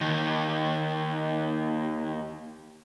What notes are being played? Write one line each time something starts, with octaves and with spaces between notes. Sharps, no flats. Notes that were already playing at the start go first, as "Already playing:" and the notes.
D#2 D#3